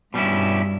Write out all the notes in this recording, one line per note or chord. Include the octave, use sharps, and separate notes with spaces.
G2 B2 G3 C#4 E4